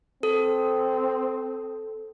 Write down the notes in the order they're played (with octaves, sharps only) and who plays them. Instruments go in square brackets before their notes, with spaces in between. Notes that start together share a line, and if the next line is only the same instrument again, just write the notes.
[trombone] C4 [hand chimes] A4